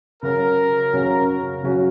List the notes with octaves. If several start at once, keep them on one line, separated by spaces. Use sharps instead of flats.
C#3 F#3 C#4 F#4 A#4
C#3 F#3 C#4 F#4
C#3 F#3 C#4 F#4